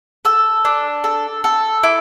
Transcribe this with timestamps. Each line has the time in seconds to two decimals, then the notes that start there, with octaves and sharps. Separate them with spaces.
0.25 A4 E6
0.65 D4
1.04 A4
1.44 A4
1.83 E4 D6